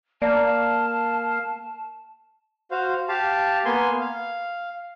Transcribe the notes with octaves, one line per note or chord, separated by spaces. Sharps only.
A#3 D5 F5 A5
F#4 C5 F5
G4 F5 A5
A#3 B3 G#5 C6
F5